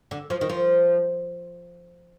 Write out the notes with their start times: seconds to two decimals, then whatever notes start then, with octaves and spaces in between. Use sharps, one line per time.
0.11 D3
0.30 F3
0.41 D#3
0.49 F3